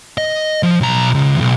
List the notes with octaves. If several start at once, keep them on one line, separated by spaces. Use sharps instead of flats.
D#5
F3
B1 A#5
C#2
B1 E2